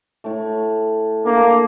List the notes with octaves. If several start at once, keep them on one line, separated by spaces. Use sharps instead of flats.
A2 A3
A#3 D4